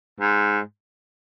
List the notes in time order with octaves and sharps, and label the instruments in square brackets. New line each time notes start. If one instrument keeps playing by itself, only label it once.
[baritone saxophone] G#2